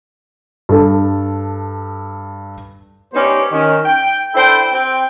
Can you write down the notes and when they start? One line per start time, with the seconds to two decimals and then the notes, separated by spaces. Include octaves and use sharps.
0.69 G2 A4
3.14 G3 B3 C#4 D#4 G4 C5
3.52 D#3 C#4
3.85 G5
4.35 D4 E4 A4 C5 G5
4.72 C4 G5